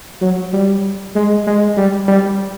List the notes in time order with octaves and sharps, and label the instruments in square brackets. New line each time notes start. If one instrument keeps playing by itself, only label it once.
[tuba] F#3
G3
G#3
G#3
G3
G3